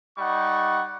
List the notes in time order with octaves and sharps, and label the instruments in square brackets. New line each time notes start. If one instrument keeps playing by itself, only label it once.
[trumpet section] G3 D#4 F#5 C#6